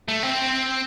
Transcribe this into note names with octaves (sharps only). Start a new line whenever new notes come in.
A3
C4